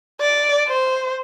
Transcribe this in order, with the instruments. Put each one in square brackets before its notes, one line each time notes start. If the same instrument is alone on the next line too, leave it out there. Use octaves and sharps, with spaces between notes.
[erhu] D5
C5